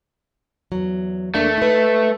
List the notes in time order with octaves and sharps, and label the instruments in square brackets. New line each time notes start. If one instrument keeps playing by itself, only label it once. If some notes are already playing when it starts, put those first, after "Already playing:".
[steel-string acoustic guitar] E2 F#3
[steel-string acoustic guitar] E2 A#3 D4 [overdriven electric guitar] A3
[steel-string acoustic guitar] D#4 B4